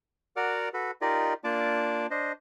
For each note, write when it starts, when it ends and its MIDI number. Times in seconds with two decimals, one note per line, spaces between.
0.36 0.69 66
0.36 0.69 70
0.36 0.69 74
0.36 0.69 78
0.36 0.69 86
0.36 0.69 89
0.74 0.91 66
0.74 0.91 69
0.74 0.91 71
1.01 1.34 63
1.01 1.34 65
1.01 1.34 67
1.01 1.34 70
1.01 1.34 74
1.01 1.34 75
1.44 2.07 58
1.44 2.07 62
1.44 2.07 65
1.44 2.07 74
1.44 2.07 81
1.44 2.07 86
2.11 2.32 62
2.11 2.32 72
2.11 2.32 75